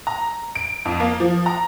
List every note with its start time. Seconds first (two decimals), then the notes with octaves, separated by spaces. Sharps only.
0.07 A#5
0.55 D7
0.85 F2
1.00 A#3
1.20 F3
1.46 A#5